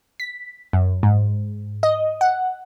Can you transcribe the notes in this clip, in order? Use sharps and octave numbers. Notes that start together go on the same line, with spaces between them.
B6
F#2
G#2
D#5
F#5